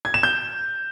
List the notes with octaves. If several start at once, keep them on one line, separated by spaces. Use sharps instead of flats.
G#6
E7
G6